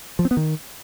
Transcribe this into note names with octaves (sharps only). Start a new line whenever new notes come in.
F3
C4
B3
D#3